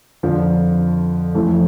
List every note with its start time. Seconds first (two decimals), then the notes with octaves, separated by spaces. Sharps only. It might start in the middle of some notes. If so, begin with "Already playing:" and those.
0.23 F2 D3 F3
1.35 F2 E3 A3 E4